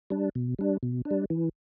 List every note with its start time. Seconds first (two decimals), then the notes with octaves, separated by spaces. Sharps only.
0.10 G3 D4
0.35 B2
0.59 G3 D4
0.83 B2
1.05 D4
1.11 G3
1.30 E3